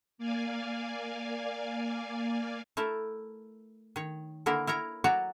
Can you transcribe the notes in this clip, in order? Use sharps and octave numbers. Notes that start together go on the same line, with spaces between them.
A#3 D5 F5 G#5
A3 E4 A#4 A5
D#3 C#5
D3 A#3 E4 A#4
E4 A#4 C#5 A#5
F#3 F#4 C#5 D5 A#5